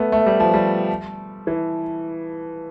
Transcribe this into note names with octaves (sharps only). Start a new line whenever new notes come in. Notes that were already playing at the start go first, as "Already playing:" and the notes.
Already playing: A3 B3
A3
G3
F3
G3
E3